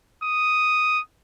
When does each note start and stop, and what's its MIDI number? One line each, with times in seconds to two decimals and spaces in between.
0.24 1.01 87